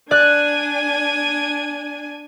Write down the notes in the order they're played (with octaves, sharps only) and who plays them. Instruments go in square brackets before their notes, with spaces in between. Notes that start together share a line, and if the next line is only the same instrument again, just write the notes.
[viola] D4 G#5 [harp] D5 F#6